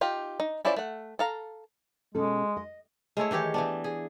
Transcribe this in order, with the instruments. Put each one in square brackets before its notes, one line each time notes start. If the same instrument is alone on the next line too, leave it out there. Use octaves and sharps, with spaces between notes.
[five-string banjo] D#4 F4 G4
D#4
C#4 E4 F4 C5 D5
A3 F#5
A4 F5 A#5
[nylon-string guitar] B2 C#4 A4 [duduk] G#3
[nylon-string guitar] D#5
[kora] G#3 A3 E4 C#5
D#3 E3 G4 C#5
E3 B3 D4
G#4